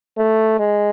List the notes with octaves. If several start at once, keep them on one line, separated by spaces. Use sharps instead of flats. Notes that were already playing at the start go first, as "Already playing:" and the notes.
A3
G#3